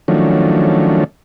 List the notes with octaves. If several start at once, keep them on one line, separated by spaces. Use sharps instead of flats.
D#3 F3 F#3 A3 C#4 D4